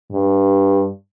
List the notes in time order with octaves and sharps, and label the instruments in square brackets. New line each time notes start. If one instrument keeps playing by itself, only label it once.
[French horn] G2